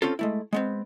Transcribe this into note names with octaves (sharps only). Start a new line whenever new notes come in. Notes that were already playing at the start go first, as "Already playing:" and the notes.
C4 C#4 F4 A4
G#3 A3 E4
G#3 B3 C4